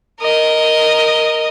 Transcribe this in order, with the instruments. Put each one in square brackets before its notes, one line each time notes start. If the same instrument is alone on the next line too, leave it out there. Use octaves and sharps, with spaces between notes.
[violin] A#4 D#5